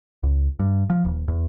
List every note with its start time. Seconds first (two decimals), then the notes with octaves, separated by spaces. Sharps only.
0.23 C#2
0.59 G2
0.90 F3
1.05 D#1
1.28 E2